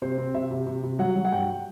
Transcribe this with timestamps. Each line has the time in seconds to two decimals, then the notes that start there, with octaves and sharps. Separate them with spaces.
0.02 C3 C5
0.18 C4
0.34 C3 E5
0.51 C3
0.66 C3
0.83 C3
0.99 F#3 F#5
1.16 F#3
1.25 F#5
1.32 G2 G5